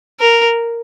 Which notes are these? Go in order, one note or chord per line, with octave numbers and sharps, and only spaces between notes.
A#4